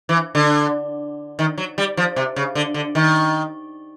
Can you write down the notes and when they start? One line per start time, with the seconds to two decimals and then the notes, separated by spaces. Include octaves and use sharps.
0.09 E3
0.35 D3
1.39 D#3
1.58 F#3
1.78 G3
1.97 F3
2.16 C3
2.36 C#3
2.55 D3
2.74 D3
2.95 D#3